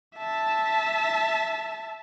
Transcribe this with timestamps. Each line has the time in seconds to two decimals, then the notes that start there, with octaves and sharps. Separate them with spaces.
0.17 E5 A5